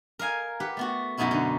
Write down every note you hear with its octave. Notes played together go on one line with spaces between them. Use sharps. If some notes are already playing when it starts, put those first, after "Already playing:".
A#4 D#5 F5 G#5
G4 B4 F#5
A3 B3 F#4
F#2 B2 B3 D#4 E4 F#4
D3 D#4